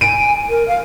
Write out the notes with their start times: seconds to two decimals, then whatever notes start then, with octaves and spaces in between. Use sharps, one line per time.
0.01 G#5 D7 D#7
0.49 A#4
0.68 F5